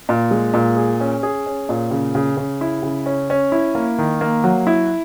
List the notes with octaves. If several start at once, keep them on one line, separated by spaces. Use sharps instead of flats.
A#2
G#3
A#2
G#4
C#4
G#4
C#4
A#2
C#3
C#3
C#3
E4
C#3
C#4
C#4
E4
A#3
D#3
A#3
F#3
E4